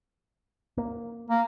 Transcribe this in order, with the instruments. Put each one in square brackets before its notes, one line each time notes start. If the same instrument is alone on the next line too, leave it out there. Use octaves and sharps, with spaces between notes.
[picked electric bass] A#3
[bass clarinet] A#3